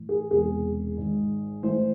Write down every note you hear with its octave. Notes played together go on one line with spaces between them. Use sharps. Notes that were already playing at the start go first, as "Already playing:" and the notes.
Already playing: A1 A2 E3
G#4
E1 E2 C3 G#4
G#1 G#2 D#3
A1 A2 E3 C5